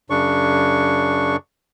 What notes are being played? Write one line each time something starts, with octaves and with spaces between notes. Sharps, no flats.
F#2 C#3 D4 C#6